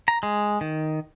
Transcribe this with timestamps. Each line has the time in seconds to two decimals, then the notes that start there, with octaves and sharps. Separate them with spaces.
0.08 A#5
0.23 G#3
0.61 D#3